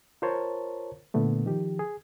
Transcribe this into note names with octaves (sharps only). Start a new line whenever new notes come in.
F4 A#4 C5 C#5 A5
A#2 D3 A3 B3
D#3 F3 G4
G#4